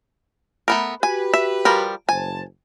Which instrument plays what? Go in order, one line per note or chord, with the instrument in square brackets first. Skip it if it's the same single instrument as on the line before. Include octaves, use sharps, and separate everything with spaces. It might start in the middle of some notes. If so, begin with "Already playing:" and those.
[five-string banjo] A3 B3 A#4
[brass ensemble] F#4 G4 B4 [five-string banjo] G#5
[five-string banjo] E5
F3 G3 A#4
[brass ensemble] F#1 C5 A5 [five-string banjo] G#5